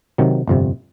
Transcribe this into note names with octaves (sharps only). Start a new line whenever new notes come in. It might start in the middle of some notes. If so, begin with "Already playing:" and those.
C3 D#3 F#3
G1 F2 C3